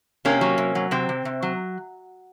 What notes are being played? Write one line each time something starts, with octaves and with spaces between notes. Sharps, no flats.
C3 A#3 C#4
F#3
C3
F#3
C3 C4
C3
C3
F#3